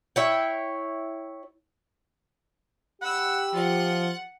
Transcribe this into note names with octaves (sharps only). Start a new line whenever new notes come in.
E4 C#5 G5
G4 F#5 B5 E6
F3 F4 F#5